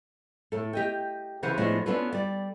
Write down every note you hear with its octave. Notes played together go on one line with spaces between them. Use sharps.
A2 A4
G4 D#5 G5
C#3 E3 C5 F#5
A2 F3 G#3 B3 D4
B3 C#4 D4 F4 A4 B4
G3 D5